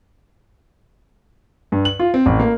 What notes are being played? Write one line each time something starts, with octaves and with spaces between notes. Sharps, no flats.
G2
F#7
F4
C4
A1
A#3